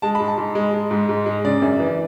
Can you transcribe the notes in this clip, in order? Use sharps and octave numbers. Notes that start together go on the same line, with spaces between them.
G#3 A5
B5
G#2
A5
G#2
G#3
G#3
G#2
G#2
G#3
C#3 D5
F#2
E3